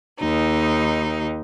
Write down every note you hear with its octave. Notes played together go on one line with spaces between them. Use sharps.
D#2 D#4